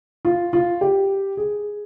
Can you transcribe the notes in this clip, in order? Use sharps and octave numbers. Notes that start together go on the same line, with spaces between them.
F4
F4
G4
G#4